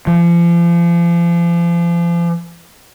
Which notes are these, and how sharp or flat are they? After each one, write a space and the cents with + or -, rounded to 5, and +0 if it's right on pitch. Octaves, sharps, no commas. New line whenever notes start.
F3 -35